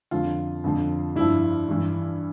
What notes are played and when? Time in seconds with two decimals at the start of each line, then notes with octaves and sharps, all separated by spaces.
0.11 F2 D3 F3 F4
0.64 F2 D3 F3
1.16 G2 F3 E4
1.69 G2 E3